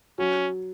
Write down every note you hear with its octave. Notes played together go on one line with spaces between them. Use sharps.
F#3 C#4